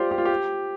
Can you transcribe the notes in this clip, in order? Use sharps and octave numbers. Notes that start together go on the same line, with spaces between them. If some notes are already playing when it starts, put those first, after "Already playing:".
Already playing: F4 G4 C5 D5
G4
F4
G4